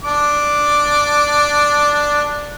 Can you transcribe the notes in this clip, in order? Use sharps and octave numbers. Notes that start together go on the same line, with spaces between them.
D4 D6